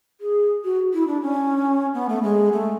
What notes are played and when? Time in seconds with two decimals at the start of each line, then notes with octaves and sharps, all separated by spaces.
0.21 G#4
0.64 F#4
0.93 E4
1.07 D4
1.22 C#4
1.94 B3
2.09 A3
2.23 G#3
2.52 A3